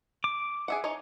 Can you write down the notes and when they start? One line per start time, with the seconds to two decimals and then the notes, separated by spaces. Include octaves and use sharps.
0.24 D6
0.68 G#4 E5 F#5
0.84 D#4 C#5